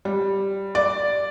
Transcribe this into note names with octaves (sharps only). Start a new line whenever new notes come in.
G3
D5